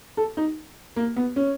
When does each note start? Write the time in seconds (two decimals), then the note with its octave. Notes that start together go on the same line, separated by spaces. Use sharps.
0.17 A4
0.37 D#4
0.96 A#3
1.16 B3
1.36 C#4